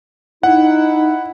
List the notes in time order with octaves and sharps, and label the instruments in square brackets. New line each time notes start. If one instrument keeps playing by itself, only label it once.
[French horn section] D#4 [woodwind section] E4 [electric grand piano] F#5